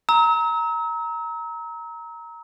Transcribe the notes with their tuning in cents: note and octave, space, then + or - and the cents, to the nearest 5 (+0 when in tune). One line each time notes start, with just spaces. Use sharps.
A#5 +0 E6 -40